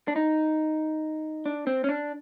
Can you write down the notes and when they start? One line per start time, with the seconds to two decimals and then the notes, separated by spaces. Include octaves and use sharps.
0.08 D4
0.16 D#4
1.46 D4
1.67 C4
1.84 C#4
1.89 D4